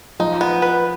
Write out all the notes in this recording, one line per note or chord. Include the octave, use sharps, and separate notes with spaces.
F3 D#4
B3
B4